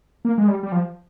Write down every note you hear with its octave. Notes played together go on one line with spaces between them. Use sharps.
A#3
G#3
G3
G3
F3